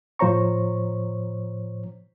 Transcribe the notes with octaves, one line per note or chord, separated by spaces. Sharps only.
A2 F3 C5 C#5 A#5 C#6